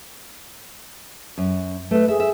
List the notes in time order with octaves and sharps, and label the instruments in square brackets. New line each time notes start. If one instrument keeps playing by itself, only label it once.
[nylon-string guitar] F#2
[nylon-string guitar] A3 D#5 [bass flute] B4
[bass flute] G#4 [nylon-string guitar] E5
[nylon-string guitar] E5